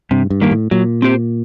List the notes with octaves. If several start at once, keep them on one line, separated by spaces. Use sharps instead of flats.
G2 C3
G2
D#3 G3 A#3
A2
A#2 F#3
C4 G4 C5